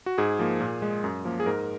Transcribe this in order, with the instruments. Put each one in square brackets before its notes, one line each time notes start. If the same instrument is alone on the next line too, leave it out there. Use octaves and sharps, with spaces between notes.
[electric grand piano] F#4
G#2 G#4
F3 A#3
A#2
G#3
F#2
F3 A#3
G#4
G#2 A#4